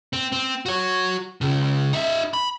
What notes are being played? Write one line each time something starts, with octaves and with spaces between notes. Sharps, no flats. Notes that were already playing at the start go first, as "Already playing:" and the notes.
C4
C4
F#4 C#5
C#2 C#3
D#4 E5
B5